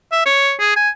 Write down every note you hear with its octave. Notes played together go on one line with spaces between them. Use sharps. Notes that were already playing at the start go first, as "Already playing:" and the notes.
E5
C#5
G#4
G#5